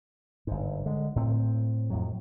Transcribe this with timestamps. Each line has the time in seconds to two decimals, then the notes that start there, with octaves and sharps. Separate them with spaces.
0.47 G1 G#2
0.86 D3 G#3
1.16 A2 C4
1.90 F2 A2 F#3